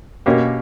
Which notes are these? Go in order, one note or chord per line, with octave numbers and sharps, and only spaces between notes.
B2 A#3 C#4 G4